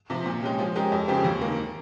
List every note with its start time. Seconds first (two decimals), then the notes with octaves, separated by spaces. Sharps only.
0.10 C3 F3
0.26 A#2
0.43 G#3 C#4 G4
0.59 F3
0.76 G#3 C#4 G4 A#4
0.92 F2
1.08 C#3 F3 C4 G4
1.24 D#2
1.41 D#3 A#3